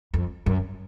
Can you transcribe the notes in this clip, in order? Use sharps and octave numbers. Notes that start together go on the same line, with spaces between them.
F2
F#2